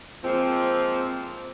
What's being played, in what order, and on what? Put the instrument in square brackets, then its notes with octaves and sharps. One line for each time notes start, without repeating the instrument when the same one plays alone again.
[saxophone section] F3 G#3 A#3 C4